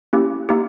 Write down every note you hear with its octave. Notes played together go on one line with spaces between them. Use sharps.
A#3 C#4 E4 G4
A#3 D#4 G4